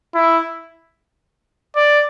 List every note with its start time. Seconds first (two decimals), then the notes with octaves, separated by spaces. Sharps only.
0.15 E4
1.76 D5